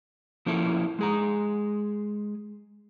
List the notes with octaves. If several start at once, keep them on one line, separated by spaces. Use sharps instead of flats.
F3 A#3 C#4 E4 A4
G#3 G#4 A#5